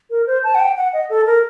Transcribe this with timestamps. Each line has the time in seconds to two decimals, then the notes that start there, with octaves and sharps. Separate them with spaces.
0.10 A#4
0.27 C5
0.44 A5
0.55 F#5
0.60 G5
0.77 F#5
0.93 D#5
1.10 A4
1.27 A#4